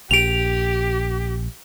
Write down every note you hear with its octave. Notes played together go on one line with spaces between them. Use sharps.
A#1 G4 D7 F7